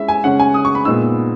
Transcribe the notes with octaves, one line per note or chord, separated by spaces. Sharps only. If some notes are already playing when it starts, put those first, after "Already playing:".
Already playing: G#3 C#4 E4 E5
G#5
C#3 G#3 C#4 F#5
G#5
D#6
C#6
B5
A#2 G#3 B3 D#4 E6